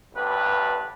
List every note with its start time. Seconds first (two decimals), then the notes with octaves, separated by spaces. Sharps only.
0.14 A1 D2 G2 B4